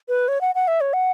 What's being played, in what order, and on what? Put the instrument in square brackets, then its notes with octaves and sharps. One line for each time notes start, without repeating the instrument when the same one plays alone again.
[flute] B4
C#5
F#5
F#5
E5
C#5
F#5